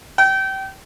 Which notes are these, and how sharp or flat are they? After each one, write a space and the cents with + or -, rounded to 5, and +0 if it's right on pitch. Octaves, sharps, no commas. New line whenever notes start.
G5 -25